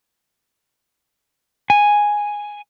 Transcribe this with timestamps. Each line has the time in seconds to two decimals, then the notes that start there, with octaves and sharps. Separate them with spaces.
1.70 G#5